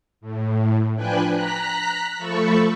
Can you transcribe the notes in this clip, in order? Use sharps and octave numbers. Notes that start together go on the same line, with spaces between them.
A2
F3 D4 B4 G5 G#5 F#6
A#5 F#6 B6
F3 A3 A4 A5 B5 C#6